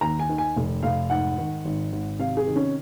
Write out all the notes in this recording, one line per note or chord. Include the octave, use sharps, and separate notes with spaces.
D#2 A#5
G#5
D#3
G#5
F1
F1 F5
G#2 F#5
D#3
G#1
G#1
C3 F5
G#4
D#3
C#4